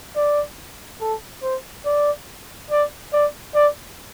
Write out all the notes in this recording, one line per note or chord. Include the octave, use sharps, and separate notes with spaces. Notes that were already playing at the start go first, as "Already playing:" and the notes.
D5
A4
C5
D5
D5
D5
D5